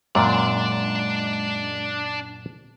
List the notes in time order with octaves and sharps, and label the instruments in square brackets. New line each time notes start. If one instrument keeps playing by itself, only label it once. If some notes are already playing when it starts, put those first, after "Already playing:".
[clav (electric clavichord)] F#2 A#2 [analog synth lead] G#3 [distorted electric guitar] D4 D5